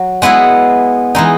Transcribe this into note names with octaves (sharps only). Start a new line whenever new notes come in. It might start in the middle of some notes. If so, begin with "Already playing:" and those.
Already playing: F#3
G#3 B3 E4 G#4
E3 G#3 D#4